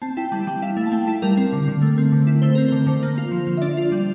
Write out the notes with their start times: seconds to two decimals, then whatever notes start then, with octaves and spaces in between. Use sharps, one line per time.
0.02 C4 A5
0.17 E4 G5
0.32 G3 A5
0.47 G3 G5
0.62 E4 F5
0.77 A3 F5
0.86 A5
0.92 A3 G5
1.07 E4 A5
1.22 G3 A#4
1.37 C4
1.53 D3
1.68 D3
1.82 A3
1.98 C4
2.12 D3
2.27 E4
2.42 A3 C5
2.55 C4 A#4
2.68 D3 C5
2.87 D3
3.03 A#3
3.18 F4
3.31 F3
3.47 F3
3.57 E5
3.62 D4 D5
3.77 F4
3.92 G3